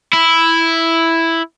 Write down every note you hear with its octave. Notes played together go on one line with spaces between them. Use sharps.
E4